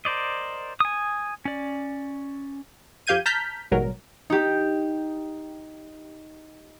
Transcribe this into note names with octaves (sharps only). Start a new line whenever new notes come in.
A#4 C5 D5 D#5
G#5 D#6
C#4 D5
F2 G4 F5 G6 G#6 D#7
A5 A#5 F6 G6 B6
A1 G#2 B2 F#3 G3 A#4
D#4 G4